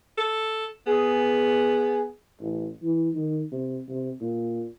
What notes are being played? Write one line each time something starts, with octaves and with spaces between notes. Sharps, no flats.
A4
B3 G#4
A1
E3
D#3
C3
C3
A#2